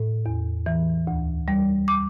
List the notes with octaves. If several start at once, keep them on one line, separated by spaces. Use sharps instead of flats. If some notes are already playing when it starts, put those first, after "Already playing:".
Already playing: A2
E2
E3
D2
G3
D6